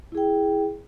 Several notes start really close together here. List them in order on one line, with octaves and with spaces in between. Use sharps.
E4 G#4 G5